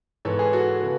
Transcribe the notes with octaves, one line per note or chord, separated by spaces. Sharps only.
G#2 E3 B3 A4 C#5
G#4 B4
F#4 A4
C#3 E3 B3